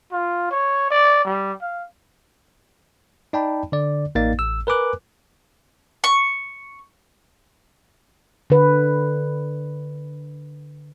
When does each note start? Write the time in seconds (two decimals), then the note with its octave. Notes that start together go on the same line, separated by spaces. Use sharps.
0.12 F4
0.51 C#5
0.91 D5
1.25 G3
1.61 F5
3.33 D#4 D5 G5 A5 B5
3.72 D3 D5
4.15 A1 A#3 D#4 D5 F5 A6
4.39 A1 E6
4.67 A#4 B4 G#5 D6 F#6
6.04 C#6
8.50 D3 B4